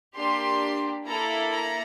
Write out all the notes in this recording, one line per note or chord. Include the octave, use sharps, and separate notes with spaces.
A#3 D4 G4 C6
A#3 E4 A4 A#5
A#5